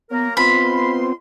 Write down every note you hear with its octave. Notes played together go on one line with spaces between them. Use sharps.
F#3 A#3 B3 A#4
G#3 B3 C4 F4 F5 B5 C6